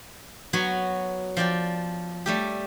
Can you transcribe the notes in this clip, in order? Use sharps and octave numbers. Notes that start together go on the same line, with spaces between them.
F#3 B3 F#4 C#5
F3 D5 G5
G3 A3 G4